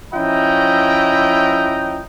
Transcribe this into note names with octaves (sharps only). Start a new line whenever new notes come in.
F3 C#4 E4 D#5 G5 A#5